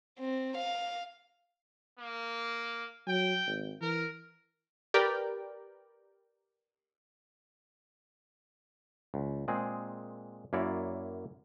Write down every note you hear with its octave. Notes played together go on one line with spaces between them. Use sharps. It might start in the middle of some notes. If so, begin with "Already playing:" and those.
C4
F5
A#3
F#3 G5
G#1
E3 A#4
G4 A#4 B4 D5 G5
C#2
A#2 G#3 C4 G#4
F#2 A#3 E4 C#5 D5